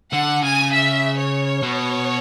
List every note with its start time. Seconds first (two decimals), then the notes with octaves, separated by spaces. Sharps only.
0.12 D3 F#5
0.42 C#3 G#5
0.72 E5
1.17 C#5
1.63 B2